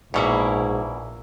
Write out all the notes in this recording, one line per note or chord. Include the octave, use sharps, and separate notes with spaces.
A#1 E2 G#2 B2 A#3 E4 C#5